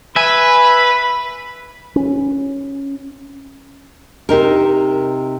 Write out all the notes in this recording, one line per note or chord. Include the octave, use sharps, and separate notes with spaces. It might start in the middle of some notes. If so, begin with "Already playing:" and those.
B4 E5 G#5 B5
C#4
C3 D#4 A#4